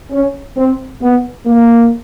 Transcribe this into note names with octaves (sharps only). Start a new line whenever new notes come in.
C#4
C4
B3
A#3